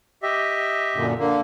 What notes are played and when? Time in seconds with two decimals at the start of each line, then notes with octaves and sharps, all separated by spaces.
0.23 G4 D#5 E5
0.96 F#2 A#2 D3
1.19 D3 A#3